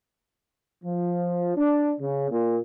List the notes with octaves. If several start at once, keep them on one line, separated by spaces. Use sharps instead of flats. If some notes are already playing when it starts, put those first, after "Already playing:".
F3
D4
C#3
A#2